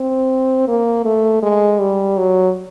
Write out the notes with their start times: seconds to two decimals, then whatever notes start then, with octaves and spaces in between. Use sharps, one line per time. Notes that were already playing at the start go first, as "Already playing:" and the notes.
Already playing: C4
0.68 A#3
1.05 A3
1.42 G#3
1.80 G3
2.18 F#3